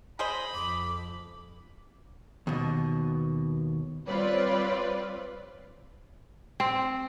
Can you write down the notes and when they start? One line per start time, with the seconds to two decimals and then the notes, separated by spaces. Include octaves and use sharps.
0.19 G#4 C5 D#5 B5
0.54 F2 D6
2.47 D#2 B2
4.06 G3 C4 F4 B4 C#5 D5
6.60 C4